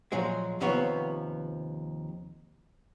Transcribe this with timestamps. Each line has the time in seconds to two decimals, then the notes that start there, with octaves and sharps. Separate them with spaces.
0.12 A#2 F3 F#3 G#3
0.60 D#2 C3 F3 B3 C#5